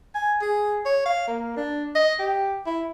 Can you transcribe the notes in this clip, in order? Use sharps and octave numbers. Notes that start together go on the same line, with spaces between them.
G#5
G#4
C#5
F5
A#3
D4
D#5
G4
E4